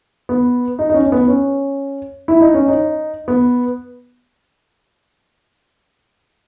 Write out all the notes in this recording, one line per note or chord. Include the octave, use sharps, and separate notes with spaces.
B3
D#4
D#4
C#4
C#4
B3
C#4
E4
D#4
C#4
D#4
B3